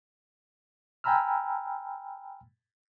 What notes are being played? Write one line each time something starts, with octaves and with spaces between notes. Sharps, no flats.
G5 G#5 A#5 B5 E6 F6